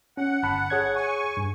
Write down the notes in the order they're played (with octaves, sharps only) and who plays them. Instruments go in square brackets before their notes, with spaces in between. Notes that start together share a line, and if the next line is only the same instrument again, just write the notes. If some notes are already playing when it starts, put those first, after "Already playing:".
[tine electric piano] C#4 [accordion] F#5
[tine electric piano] G1 A5 B5
G#4 C#5 G#6
[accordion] G#5 C#6
[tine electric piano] G2